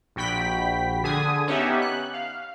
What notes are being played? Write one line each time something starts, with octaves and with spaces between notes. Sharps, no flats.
A#1 F#4 G5 B5 B6
D3 G#4 G#5 D#6
B3 C#4 D#4 G4 E5 F#5
F#6
F5